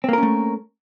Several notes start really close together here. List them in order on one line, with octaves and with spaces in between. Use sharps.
C4 A#3 A#4 C#4 A3